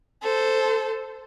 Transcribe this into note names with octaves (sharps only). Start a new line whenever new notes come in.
A4 C5